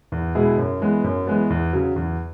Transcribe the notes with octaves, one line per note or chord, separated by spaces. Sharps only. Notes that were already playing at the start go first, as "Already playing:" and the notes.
E2
B2 G#3 E4 G#4
F#2
E3 G#3 B3
F#2
E3 G#3 B3
E2
C#3 F#3
E2